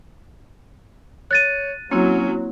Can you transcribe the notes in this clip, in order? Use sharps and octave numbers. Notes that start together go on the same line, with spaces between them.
C#5 F#6 A6 D#7
F#3 A#3 C4 C#4 E4